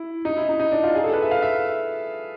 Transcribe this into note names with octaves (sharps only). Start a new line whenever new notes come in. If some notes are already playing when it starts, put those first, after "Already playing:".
Already playing: E4
D#4
E4
D#4
D#4
D4
F4
G#4
A4
B4
E5
F5
E5